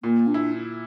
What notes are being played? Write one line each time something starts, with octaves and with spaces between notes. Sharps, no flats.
A#2 A#3
D4
E4